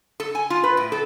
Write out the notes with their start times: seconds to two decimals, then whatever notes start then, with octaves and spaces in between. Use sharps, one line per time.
0.20 A4
0.35 G#5
0.50 F4
0.64 B4
0.77 A2
0.92 A4